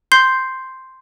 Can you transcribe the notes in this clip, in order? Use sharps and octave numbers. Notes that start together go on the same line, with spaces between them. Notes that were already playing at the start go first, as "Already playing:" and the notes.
C6 G6 C7